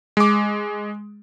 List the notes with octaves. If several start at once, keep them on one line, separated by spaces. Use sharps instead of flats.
G#3 D6